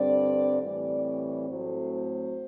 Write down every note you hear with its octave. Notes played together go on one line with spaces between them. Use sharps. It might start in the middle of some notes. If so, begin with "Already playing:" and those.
Already playing: G2 D3 G3 C4 D5
A2 E3 G3 C4 D5
C#5
A2 F#3 A3 C4 C5
C5